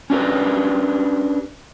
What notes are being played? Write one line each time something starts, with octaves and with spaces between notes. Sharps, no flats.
C#4 D4 G4 A#4 B4